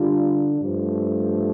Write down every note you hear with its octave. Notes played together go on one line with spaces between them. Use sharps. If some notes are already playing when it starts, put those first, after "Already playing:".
Already playing: D3 G3 D4 F4
G2 F3 A3